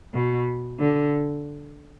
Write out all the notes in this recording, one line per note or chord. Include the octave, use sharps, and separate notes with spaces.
B2
D3